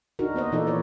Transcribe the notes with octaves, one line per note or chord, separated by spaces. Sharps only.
D4 D#4 F#4 A#4
A#3 B3 C5 D#5
A#2 E3 D#4 F4 A4 D5
B4 C#5 D5